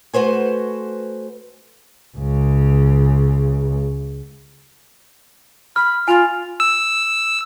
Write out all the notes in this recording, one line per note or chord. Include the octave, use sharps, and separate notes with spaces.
A3 F#4 B4 C5 G#5
C#2 C#3
B5 F6
F4 G#5 F7
E6